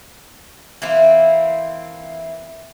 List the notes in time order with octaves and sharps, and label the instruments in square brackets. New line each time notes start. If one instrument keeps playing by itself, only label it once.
[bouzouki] E3 A#3 C4 E4